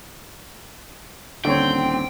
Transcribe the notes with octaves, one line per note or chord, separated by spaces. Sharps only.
D#1 D3 C4 C#5 G5